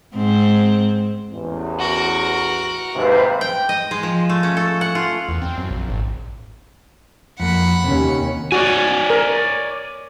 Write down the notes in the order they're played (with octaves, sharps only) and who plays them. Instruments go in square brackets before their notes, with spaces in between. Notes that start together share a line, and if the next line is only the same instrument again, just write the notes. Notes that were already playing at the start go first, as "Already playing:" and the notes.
[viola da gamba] G#2 C4
[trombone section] A1 E2
[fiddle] F#4 A#4
[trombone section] D#2 G#2 C3 [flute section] B4 C5 F5
[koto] G5
D#5
G#3
F3
A3
C#4
A4
F#5
F4
[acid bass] E2
C4
F#2
A#1
G#1
[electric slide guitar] F2 A#3 [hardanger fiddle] F#5 B5
[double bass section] D#2 C#4 [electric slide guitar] C3
[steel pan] F#4 [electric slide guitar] C#5 D5 G#5
[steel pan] A#4